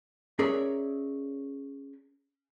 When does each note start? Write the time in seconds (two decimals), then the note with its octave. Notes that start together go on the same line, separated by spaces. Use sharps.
0.39 C#4 G#4 A#4 C#5 D5 E5